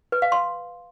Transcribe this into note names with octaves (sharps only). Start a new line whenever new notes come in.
B4
F5
C6